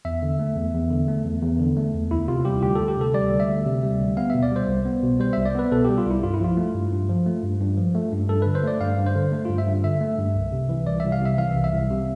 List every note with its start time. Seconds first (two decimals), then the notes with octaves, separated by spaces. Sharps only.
0.05 E2 E5
0.22 D3
0.39 A3
0.56 E2
0.74 E2
0.91 D3
1.08 A3
1.25 E2
1.42 E2
1.59 D3
1.77 A3
1.94 E2
2.11 D2 E4
2.28 C3 F4
2.45 G3 G4
2.63 D2 G4
2.75 D2 A4
2.88 G4
2.97 C3 A4
3.14 G3 D5
3.31 D2
3.40 E5
3.48 D2
3.66 C3
3.83 G3
4.00 D2
4.17 B3 F5
4.30 B2 E5
4.42 D5
4.51 G3 C5
4.68 C2
4.85 B3
5.03 B2
5.20 G3 C5
5.33 C2 E5
5.46 D5
5.55 B3 B4
5.72 B2 A4
5.85 G3 G4
5.98 F4
6.06 C2 E4
6.23 G2 F4
6.34 E4
6.40 F3 F4
6.57 A3
6.75 G2
6.92 G2
7.09 F3
7.26 A3
7.43 G2
7.61 G2
7.78 F3
7.95 A3
8.12 G2
8.29 G2 A4
8.42 D3 B4
8.55 C5
8.64 A3 D5
8.81 G2 F5
8.98 G2
9.06 C5
9.15 D3
9.32 A3
9.45 G2 F4
9.58 E5
9.66 G2
9.84 D3 E5
10.01 A3
10.18 G2
10.35 C2
10.52 C3
10.69 E3
10.87 C2 D5
11.00 C2 E5
11.12 F5
11.21 C3 E5
11.38 E3 F5
11.56 C2
11.64 E5
11.73 C2
11.90 C3